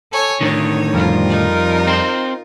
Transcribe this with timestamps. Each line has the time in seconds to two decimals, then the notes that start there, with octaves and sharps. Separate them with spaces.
0.11 A4 C#5 G#5
0.41 A2 D3 D#3 D#4 C#5
0.93 F2 F3 G3 F4 A#4
1.29 D#4
1.87 C4 C5